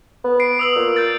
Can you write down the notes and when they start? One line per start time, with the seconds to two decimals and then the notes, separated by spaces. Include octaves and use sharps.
0.24 B3
0.40 C7 D7
0.59 D#6 E6 F#7
0.76 A#2
0.96 G6 A6